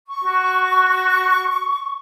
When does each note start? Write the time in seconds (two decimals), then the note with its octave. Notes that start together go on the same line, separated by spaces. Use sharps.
0.06 C#6
0.24 F#4